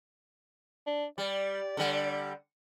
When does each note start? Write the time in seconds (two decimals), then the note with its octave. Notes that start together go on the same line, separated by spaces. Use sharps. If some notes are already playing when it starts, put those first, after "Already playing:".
0.87 D4
1.18 G3 D5
1.77 D3 G3